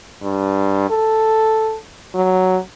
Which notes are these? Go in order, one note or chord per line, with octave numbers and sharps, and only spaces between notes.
G2
A4
F#3